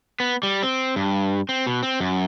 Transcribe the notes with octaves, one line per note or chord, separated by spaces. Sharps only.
B3
G3
C4
G2
C4
B2
C4
F#2